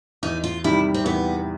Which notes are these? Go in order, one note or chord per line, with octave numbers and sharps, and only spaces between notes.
E2 D#4
F4
C3 D#3 G3 E4
C4
E2 B3